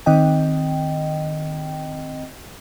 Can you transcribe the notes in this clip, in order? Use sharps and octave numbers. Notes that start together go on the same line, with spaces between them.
D#3 C4 D#5 G5